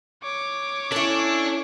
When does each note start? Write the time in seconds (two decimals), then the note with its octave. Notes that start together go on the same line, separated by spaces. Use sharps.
0.24 C#5 D6
0.92 C#4 D4 E4 A4